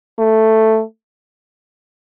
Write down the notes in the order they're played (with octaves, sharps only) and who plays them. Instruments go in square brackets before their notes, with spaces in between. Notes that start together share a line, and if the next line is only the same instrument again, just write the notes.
[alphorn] A3